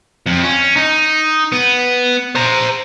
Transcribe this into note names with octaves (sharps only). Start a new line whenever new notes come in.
F2
C#4
D#4
B3
C5 A#5